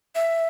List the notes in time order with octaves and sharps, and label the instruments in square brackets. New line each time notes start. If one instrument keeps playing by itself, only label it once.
[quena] E5